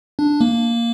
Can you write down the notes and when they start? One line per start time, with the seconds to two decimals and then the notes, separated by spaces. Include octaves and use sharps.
0.19 D4
0.41 A#3